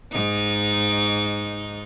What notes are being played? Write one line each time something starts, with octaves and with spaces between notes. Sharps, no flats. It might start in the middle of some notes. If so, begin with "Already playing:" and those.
G#2 D#4